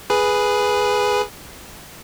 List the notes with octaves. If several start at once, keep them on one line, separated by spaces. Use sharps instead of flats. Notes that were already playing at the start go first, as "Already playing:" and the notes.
G#4 B4